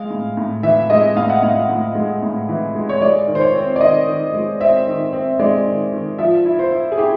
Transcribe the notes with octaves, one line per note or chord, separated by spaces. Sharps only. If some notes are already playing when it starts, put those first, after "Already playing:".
Already playing: G#3 F5
A2
A2
E3 E5
G#3 D#5
A2 F5
F#5
A2 F5
A2
G#3
A2
E3
G#3
C#5
G#3 D5
D#3
C5
C#5
C4
D5
D#3 D#5
D#3
G#3
C4 E5
D#3
C4
G#3 D5
D#3
D#3
F3 E5
E4
C5
E4
G#4
E4 G4